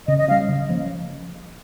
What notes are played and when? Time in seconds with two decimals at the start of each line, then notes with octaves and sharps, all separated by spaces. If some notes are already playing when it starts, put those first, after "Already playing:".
0.07 C#3 D#5
0.18 D#5
0.28 C#4 F5
0.31 G3
0.48 C#3
0.69 F3 A#3 C#4